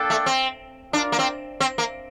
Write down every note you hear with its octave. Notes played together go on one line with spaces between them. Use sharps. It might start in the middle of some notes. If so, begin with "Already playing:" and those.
Already playing: A#3 D4 A4 D5 G5
A3
C4
D4 F4 A#4 D5
A#3
C4
C4
A#3